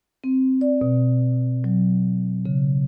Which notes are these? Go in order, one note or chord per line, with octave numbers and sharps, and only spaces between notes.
C4
D5
B2
F#3
C#3